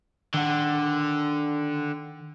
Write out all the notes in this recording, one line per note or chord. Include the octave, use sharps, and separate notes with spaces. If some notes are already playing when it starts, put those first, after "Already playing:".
D3 D#3 F#5